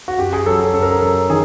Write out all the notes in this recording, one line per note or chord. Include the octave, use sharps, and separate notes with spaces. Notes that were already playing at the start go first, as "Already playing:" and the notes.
F#4
F#2 G4
G#4
F#3 A4
A4
F#2 A4
A#4
A4
F#3 A4
D#3 G#4